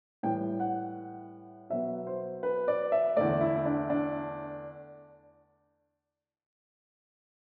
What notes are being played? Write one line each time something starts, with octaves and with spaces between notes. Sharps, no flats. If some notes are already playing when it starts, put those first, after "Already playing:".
A2 E3 G3 G5
F#5
B2 F#3 B3 E5
C5
B4
D5
E5
E2 D3 A3 D5
E4
E4
D4
D4